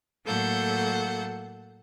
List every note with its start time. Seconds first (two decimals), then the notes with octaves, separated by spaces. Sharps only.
0.24 A2 F#3 A#3 A4 F#5 G6